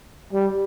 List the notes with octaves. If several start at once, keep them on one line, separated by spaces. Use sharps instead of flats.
G3